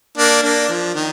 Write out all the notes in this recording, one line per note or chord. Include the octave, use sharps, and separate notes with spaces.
A#3 D4
A#3 D4
F3
D#3